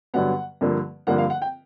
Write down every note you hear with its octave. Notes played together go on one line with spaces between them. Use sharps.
G2 D3 F#3 B3 F#5
G2 D3 F3 A#3
G2 D3 F3 A#3 F#5
F5
F#5
G5